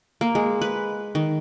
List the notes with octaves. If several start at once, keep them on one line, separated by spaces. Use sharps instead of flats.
A#3
G#3
B4
D#3